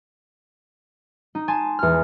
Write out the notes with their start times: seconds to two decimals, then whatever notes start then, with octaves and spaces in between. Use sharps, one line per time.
1.35 D#4
1.48 G#5 A5 C6
1.79 E2 F6